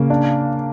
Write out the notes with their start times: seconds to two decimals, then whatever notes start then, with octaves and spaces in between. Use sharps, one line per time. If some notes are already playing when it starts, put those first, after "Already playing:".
Already playing: C#3 A#3
0.10 D4